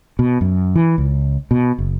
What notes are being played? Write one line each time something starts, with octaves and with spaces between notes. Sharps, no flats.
B2
F#2
E3
C#2
B2
F#1